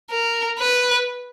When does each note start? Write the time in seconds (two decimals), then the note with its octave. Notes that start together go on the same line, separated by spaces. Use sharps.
0.11 A#4
0.59 B4